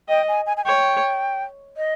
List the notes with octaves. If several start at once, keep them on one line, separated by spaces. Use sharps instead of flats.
D#5 G5
G#5
G#5
G#5
C#5 G5
D#5